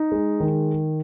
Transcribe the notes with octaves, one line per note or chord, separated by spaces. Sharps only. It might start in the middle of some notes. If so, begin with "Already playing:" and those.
Already playing: D#4
G#3
D#3